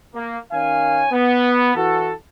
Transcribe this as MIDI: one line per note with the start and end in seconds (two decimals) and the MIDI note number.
0.15 0.38 58
0.52 1.07 51
0.52 1.07 61
0.52 1.07 73
0.52 1.07 77
0.52 1.07 80
1.12 1.71 59
1.75 2.12 52
1.75 2.12 66
1.75 2.12 69